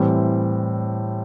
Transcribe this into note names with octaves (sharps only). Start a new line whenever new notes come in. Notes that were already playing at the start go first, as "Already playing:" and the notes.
Already playing: A2 E3 G3 C4